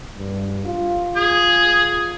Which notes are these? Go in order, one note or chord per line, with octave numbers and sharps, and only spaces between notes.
G2
F4
G#4